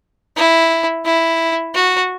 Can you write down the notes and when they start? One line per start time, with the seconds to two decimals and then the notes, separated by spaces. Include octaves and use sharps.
0.36 E4
1.05 E4
1.75 F#4